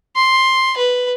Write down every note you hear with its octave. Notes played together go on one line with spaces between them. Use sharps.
C6
B4